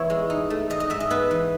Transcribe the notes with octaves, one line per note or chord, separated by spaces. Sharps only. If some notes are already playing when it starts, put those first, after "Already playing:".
Already playing: E2 B3 E4 C#5
G#3
D#4
A3
G#2 D#5
D#5
G#2 E5
D#5
B3 B4
E3